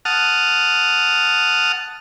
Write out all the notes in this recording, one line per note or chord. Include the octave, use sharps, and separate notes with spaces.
F#5 A5 D#6 F6